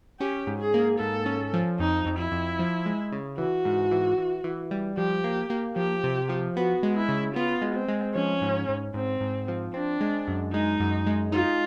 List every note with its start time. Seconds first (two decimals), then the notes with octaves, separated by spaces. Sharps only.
0.20 C#4 G4
0.47 G#2
0.60 G#4
0.74 A#3
0.99 G#2 A4
1.26 C#4
1.53 F3
1.79 F2 D#4
2.06 F2
2.19 E4
2.32 F2
2.59 F3
2.86 G#3
3.12 C#3
3.38 E3 F#4
3.65 G#2
3.91 E3
4.18 E3
4.44 E3
4.71 G3
4.97 F3 G4
5.24 A#3
5.50 A#3
5.76 F3 G4
6.04 C3
6.29 F3
6.56 B3 F#4
6.83 G#3
6.96 E4
7.09 C#3
7.35 B3 F4
7.62 G#3
7.75 C4
7.88 G#3
8.15 F3 C#4
8.41 G#2
8.69 G#2
8.94 G#2 C4
9.20 G#2
9.48 F3
9.74 C4 D4
10.01 G#3
10.28 F#2
10.53 G#3 D#4
10.80 F#2
11.07 G#3
11.32 D#4 F4